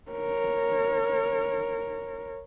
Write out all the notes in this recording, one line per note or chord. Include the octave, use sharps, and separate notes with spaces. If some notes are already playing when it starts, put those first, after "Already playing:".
A#4 C#5